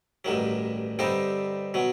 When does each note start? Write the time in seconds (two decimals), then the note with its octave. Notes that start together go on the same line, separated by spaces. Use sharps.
0.25 A1 G2 D#3 F#3
0.99 G2 D3 G3 C4 D#4
1.74 B2 F#3